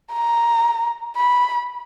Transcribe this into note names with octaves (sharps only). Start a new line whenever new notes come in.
A#5
B5